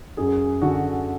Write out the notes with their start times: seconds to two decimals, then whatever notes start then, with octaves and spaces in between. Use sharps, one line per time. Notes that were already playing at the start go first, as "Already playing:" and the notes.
0.17 F#2 G#4
0.62 D3 F#4